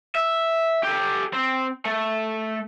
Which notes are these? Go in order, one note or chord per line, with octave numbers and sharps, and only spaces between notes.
E5
G4 A4
C4
A3